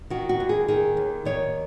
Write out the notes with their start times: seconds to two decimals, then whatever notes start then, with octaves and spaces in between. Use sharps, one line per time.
0.10 D#3 F#4
0.29 F#4
0.40 D#2
0.49 G#4
0.68 D#3 G#4
0.97 D#2
1.25 D#3 C#5